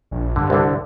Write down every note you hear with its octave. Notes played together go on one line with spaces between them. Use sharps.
A#1
G2 D3
C2 D3